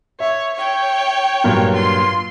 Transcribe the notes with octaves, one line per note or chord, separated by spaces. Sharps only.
C#5 E5
C#5 G5
G2 A#2 F#3
F4 C6